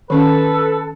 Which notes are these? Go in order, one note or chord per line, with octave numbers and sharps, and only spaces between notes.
D#3 C#4 A4 B4